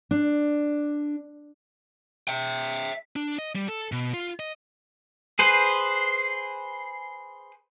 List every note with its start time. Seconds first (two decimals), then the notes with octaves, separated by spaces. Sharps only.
0.11 D4
2.28 E5 G5
3.16 D4
3.39 D#5
3.55 G3
3.68 A4
3.92 B2
4.14 F4
4.40 D#5
5.39 G#4 B4 C5